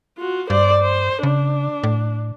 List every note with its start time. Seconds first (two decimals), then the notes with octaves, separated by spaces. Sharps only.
0.18 F4 F#4
0.50 G2 C5 D5
0.81 C5
1.23 C#3 D4
1.84 A2